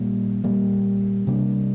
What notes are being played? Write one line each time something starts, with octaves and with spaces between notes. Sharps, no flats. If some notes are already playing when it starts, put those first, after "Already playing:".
Already playing: A#2 G3 A#3
A#2 G3 A#3
C3 G3 A#3 D4